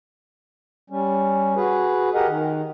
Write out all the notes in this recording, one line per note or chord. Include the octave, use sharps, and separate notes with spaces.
G3 C#4
F#4 G#4 B4
G4 G#4 A#4 D#5 F#5
D#3